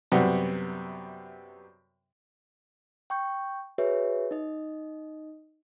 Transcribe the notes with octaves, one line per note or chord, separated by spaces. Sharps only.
F#2 C3 G3 B3
G5 C#6 G6
F#4 G#4 B4 C#5 E5
D#4 D#5